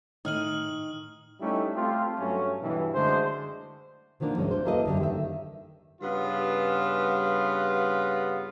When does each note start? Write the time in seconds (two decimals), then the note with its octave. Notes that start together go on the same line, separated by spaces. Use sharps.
0.25 A2 D#3 G#5 D#6 F6 F#7
1.41 G3 A3 C#4 D#4 E4
1.74 A3 C4 F4 G4
2.19 G2 F#3 A3 C#4
2.62 G2 B2 E3
2.94 F#2 D3 G#3 A3 C5
4.20 B2 D#3 F3 A#3 D4
4.37 D2 G#2 G#3 C#4
4.51 D4 C5
4.65 A#3 D4 E4 A4 B4 D#5
4.85 F#2 D3 G3
5.00 D#3 E5
6.01 G2 C#3 B3 F4